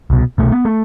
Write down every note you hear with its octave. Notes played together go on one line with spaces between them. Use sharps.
C2 B2
C2 B2 A3
B3
A3